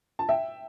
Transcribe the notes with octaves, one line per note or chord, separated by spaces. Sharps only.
A5
E5 G5